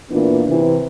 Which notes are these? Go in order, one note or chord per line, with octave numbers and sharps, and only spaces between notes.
A#2 E3 A#3 B3 D4 F4
C3 E3